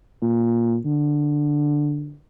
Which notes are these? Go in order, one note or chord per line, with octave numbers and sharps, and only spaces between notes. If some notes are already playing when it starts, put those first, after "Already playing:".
A#2
D3